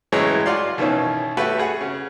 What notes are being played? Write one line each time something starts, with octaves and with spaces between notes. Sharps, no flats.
A2 C#3 E3 F#3 G#3
F4 F#4 D5 F5 C6
B2 D#3 E3 C#4
A3 F#4 G4 B4
F#4 G#4 F#5
C#3